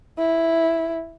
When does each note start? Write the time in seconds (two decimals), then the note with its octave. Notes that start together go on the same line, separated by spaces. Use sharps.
0.18 E4